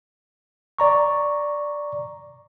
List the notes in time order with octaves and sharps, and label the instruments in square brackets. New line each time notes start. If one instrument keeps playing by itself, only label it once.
[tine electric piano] D5 A#5 C#6